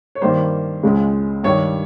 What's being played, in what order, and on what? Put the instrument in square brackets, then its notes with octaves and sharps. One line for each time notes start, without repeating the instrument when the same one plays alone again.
[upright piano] C#5
G2 D#3 G3 A#3 C5
C#2 C#3 G#3
G2 D#3 G3 C#5